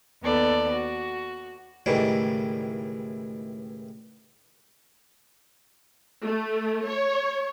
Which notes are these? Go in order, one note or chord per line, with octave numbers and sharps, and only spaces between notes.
D#2 B3 A4 D5
F#4
C#2 A2 D#3 E3 G3
A3
C#5